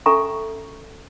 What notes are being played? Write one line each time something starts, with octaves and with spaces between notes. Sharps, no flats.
C#4 A4 E5 G#5 A#5 C#6